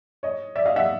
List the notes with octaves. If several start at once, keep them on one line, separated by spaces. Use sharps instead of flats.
C#5 D#5
D5 E5
D#5 F5
E5 F#5